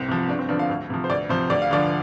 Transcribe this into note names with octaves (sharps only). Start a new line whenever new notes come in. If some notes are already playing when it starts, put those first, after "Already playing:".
Already playing: C2 C4
C3 F3
G1 D4
C4
G2 D3 F3 D4
F5
D2
C3 F3
C5
D2 D5
C3 F3 C5
D2 D5
F5
D3 F3 D5